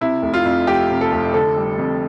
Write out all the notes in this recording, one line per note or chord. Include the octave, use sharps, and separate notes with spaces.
C3 E4
F1
F4
F2
F1 G4
C3
A4
F1
D3 A4
G3
F2